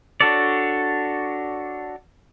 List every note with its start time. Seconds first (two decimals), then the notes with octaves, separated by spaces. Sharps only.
0.21 D4 F#4 A4 C#5 D5